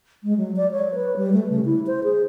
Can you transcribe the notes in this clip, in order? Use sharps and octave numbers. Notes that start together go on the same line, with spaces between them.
G#3
F#3
D5
C#5
B4
G3
A3
C#3
E4
C5
G#4